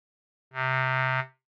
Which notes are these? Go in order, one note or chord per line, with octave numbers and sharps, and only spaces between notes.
C3